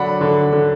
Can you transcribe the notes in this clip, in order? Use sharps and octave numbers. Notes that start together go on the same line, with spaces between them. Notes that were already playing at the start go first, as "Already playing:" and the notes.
Already playing: D3 F#3 D4 F#5 B5
D3
D3